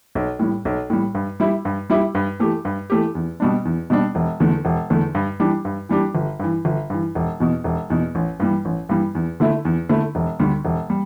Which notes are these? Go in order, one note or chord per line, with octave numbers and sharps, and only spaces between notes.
B1
A2 G3
B1
A2 G3
G2
G3 E4 G4
G2
G3 E4 G4
G2
E3 A3 G4
G2
E3 A3 G4
E2
B2 G3 D4
E2
B2 G3 D4
E1
E2 D3 A3
E1
E2 D3 A3
G2
E3 G3 D4 G4
G2
E3 G3 D4 G4
G1
G2 E3
G1
G2 E3
E1
E2 B2
E1
E2 B2
A1
G2 E3 G3
A1
G2 E3 G3
E2
D3 A3 E4
E2
D3 A3 E4
E1
D2 D3 G3
E1
G3